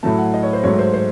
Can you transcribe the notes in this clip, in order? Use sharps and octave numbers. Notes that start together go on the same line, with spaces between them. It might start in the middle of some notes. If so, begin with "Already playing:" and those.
A2 F#3 A3 A5
F#5
D#5
C#5
C5
G#2 F#3 A3 C#5
C5
C5